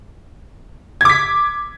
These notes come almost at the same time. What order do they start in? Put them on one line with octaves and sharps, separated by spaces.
G#6 D6 B6